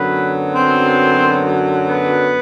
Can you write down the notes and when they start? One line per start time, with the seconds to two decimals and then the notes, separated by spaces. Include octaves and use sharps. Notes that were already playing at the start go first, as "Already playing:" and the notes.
Already playing: F#2 D3 F#3 B3 B4
0.54 C4 C5
1.86 B3 B4